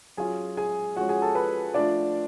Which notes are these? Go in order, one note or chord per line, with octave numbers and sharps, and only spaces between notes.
F#3 C#4 F4 G#4 G#5
G#4 G#5
F3 G#3 C#4 F#4 F#5
G#4 G#5
A4 A5
B4 B5
F3 A3 D4 F4 D5